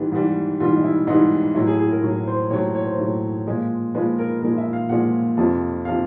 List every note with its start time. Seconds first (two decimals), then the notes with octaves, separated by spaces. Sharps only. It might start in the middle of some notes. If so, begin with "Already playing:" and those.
Already playing: G#2 E3 G3
0.12 G#2 E3 G3
0.60 G#2 E3 G3 F4
0.76 D#4
0.84 E4
1.07 G#2 E3 G3 D#4
1.55 A2 F#3 E4
1.67 G#4
1.79 G#4
1.91 A#4
2.02 A2 F#3
2.27 C5
2.50 A2 F#3 C#5
2.75 C#5
2.86 C5
2.98 A2 F#3
3.47 A#2 F3 G#3
3.95 A#2 F3 G#3 B4
4.19 A#4
4.42 A#2 F3 G#3 A#4
4.58 E5
4.73 F5
4.89 A#2 F3 G#3 F#5
5.37 F2 C3 F3
5.85 C3 F3 F5